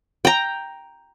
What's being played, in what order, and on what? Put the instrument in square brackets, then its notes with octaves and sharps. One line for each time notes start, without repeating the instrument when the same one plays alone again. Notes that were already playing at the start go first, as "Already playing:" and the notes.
[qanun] G5 A#5